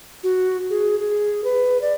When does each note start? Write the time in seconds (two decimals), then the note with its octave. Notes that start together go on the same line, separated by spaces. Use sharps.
0.23 F#4
0.70 G#4
0.99 G#4
1.44 B4
1.82 D5